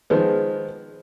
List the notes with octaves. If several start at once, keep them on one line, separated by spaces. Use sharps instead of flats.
D#3 F3 G#3 B3